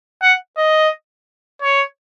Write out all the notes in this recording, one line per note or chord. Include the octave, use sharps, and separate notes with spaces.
F#5
D#5
C#5